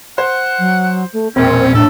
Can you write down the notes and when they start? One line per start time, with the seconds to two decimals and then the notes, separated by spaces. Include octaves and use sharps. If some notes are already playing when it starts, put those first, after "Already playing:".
0.18 C5 F#5
0.59 F#3
1.13 A3
1.36 E1 A#1 C4 C#4 A#4
1.74 A2 D4 A4